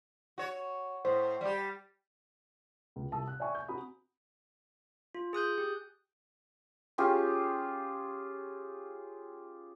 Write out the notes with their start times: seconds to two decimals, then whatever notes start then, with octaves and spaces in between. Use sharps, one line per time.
0.38 F#4 C#5
1.05 A2 C5
1.41 G3 G4
2.96 C#2
3.12 C2 A5 D#6 E6
3.28 F#6
3.40 D5 E5 G5 G#5 C#6
3.55 G6
3.68 C4 F#4 G#5 A#5 B5 D#6
5.15 F4
5.33 G#4 D#6 F#6 G6
5.58 G4
6.98 C#4 F4 G4 G#4